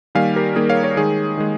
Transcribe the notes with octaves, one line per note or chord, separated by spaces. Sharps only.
D#3 G3 A#3 F5 G#5
G4 A#4
D#3 G3 A#3 G#4
C#5 F5
A#4 C#5
D#3 G#3 G#4
D#3 G#3